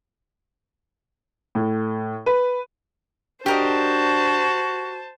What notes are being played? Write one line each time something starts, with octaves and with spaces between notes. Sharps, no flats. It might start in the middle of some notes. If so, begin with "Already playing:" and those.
A2
B4
D4 F#4 G4 A#4 C5 D#5 A5